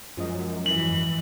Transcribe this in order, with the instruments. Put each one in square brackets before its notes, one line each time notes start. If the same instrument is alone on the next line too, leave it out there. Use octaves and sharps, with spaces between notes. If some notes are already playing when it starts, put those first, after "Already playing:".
[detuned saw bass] F#2 [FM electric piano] F3 G#3 D#5
[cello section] G#2 E3 [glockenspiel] F#7